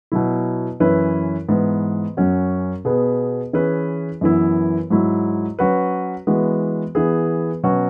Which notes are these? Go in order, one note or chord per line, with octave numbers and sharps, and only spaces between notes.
B2 F#3 E4
F#2 E3 C#4 E4 B4
G#2 E3 B3
F#2 F#3 C#4 F#4
B2 B3 G#4 B4
E3 C#4 E4 G#4 B4
F#2 E3 B3 E4
G#2 F#3 E4
F#3 C#4 F#4 B4
E3 G#3 B3 F#4 B4
E3 B3 G#4 B4
B2 F#3 C#4 F#4 B4